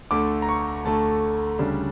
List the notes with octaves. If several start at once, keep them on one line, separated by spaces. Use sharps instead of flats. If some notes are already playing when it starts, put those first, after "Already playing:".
D2 D3 A3 D6
A#5
C#6
D2 D3 A3 A5
D2 C#3 G3 D4